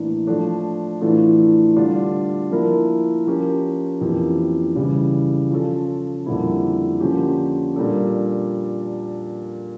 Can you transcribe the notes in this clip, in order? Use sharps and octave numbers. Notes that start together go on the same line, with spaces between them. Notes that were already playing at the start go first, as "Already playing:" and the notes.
Already playing: A2 E3 A#3 D4
F3 A3 D4 A4
A2 E3 A3 D4 F4
D3 G3 D4 F4
F3 A#3 E4 A#4
F3 C#4 G4 A#4
F2 E3 A#3 C#4 G4
C#3 E3 G3
F3 C#4 F4 A4
F2 D3 G3 A#3 E4
D3 F3 A#3 C#4 G4
A#2 G3 A#3 D4 A4